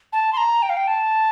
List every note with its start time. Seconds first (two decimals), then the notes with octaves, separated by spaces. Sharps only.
0.13 A5
0.33 C6
0.37 A#5
0.62 G5
0.69 F5
0.77 G5
0.87 A5